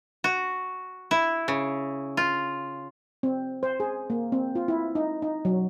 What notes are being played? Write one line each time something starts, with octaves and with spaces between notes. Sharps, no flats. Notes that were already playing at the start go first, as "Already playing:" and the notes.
F#4
E4
C#3
F4
C4
C5
G#4
A#3
C4
F4
E4
D#4
D#4
F#3